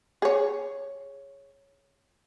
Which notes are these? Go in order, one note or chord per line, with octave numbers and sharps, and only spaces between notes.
G#4 C#5